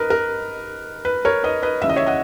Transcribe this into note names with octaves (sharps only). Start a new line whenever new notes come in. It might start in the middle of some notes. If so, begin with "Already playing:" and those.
Already playing: A#4 B4 D#5
A#4
B4
A#4 C#5
B4 D#5
B4 D#5
D#2 C#3 E3 E5
D#5
C#5 E5
D#5 F#5